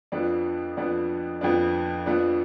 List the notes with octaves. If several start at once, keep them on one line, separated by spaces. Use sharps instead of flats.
F2 F3 B3 D4
F2 F3 B3 D4
F2 F3 B3 D4
F2 F3 B3 D4